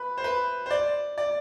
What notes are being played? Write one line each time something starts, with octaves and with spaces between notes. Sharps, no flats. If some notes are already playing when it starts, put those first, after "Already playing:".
Already playing: B4
C5
B4
C5
D5
D5